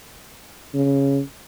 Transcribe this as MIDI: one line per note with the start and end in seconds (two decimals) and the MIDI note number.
0.74 1.20 49